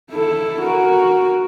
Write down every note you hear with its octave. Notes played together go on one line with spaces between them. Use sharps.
E4 A4
F#4 A#4